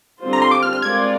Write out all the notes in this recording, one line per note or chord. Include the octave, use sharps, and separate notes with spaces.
D3 G3 C4 F4 C5
A#5
C6
D6
F6
F6
G#3 C4 F4 A#4 D5 G#6